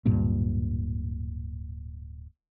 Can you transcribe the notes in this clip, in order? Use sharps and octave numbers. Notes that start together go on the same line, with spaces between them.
D1 G2 A#2